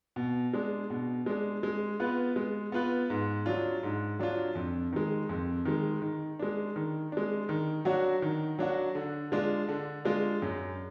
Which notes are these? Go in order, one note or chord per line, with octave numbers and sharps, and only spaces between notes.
B2
G#3 D4
B2
G#3 D4
G#3
B3 F4 B4
G#3
B3 F4 B4
G#2
F#3 D4 F4
G#2
F#3 D4 F4
F2
D#3 G#3
F2
D#3 G#3
D#3
G#3 D4
D#3
G#3 D4
D#3
F#3 D4 F#4
D#3
F#3 D4 F#4
D3
G#3 D4 F4
D3
G#3 D4 F4
F#2